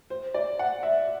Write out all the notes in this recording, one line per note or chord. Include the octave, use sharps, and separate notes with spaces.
C5
D5
F#5
E5